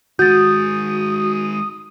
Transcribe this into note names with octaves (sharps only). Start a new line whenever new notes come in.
D#3 G#3 F#4 D#6 G6 A6